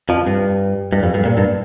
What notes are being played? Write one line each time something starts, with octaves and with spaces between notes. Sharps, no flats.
F2 F3
G2
G2
F2
G2
A#2
G2